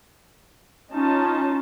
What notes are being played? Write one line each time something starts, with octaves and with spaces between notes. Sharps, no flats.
C#4 D#4 F4 A5